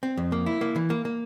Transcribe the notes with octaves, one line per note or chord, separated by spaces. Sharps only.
C4
F2
A#3
E4
A#3
E3
A#3
A#3